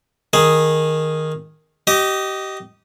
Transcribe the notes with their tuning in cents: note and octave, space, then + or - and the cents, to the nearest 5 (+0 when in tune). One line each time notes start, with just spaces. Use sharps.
D#3 +0 G#4 +0
G4 -25 D#5 +0